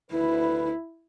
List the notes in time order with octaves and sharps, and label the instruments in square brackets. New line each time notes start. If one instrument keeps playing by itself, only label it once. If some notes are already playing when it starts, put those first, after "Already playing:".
[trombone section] D2 B4 [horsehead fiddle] E4